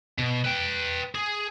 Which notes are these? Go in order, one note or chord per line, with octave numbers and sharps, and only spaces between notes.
B2
B4 G5
G#4